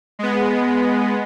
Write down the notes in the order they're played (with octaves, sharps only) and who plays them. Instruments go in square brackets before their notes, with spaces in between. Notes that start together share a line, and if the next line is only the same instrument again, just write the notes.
[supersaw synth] G#3 B3